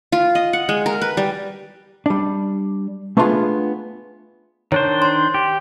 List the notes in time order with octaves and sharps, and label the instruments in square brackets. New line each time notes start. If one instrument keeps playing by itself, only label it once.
[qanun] F4
D#5
F#5
G#3
A#4
B4
G3
[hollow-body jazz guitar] G3 D4
A3 B3 D4 D#4 F4 G#4
[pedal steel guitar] D#3 D4 C5 [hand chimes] C#5
[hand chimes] C6
[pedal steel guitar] G4